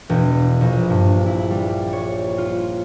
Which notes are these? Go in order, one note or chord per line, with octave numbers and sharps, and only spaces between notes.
E1
A#1
G2
E4
G3
C#5
F4